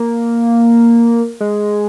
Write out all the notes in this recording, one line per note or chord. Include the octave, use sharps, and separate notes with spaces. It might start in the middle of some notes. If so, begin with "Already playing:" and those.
Already playing: A#3
G#3